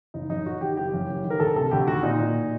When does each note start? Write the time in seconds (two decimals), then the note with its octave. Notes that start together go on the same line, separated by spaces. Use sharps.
0.14 F#1 D#4
0.30 F#2 D#4
0.45 F#1 F#4
0.61 D#3 G4
0.77 F#1 G4
0.94 F#2
1.09 F#1
1.25 D#3
1.30 A#4
1.40 D2 A4
1.56 C3 A4
1.71 D2 G4
1.88 D#3 F#4
2.03 A#2 D#4
2.20 A#2